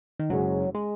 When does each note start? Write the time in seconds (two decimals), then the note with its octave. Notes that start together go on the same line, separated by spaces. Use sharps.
0.20 D#3
0.30 F#1 F#2 C#3 F#3 G#3 C#4
0.75 G#3